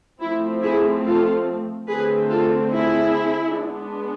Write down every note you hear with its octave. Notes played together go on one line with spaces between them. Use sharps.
F3 A3 C4 E4
E4 G#4
F4 A4
D3 A3 C4 G#4 B4
F4 A4
E4 G#4
G#3 B3 D4